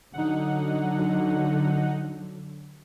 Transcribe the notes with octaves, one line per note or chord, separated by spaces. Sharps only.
D3 F#3 D#4 F#5